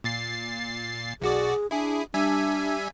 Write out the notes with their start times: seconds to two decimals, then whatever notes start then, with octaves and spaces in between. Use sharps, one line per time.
0.04 A#2 A6 C7
1.21 B1 F#4 G#4 D5
1.71 D4 E4 G#4
2.14 G3 D4 E5 G#5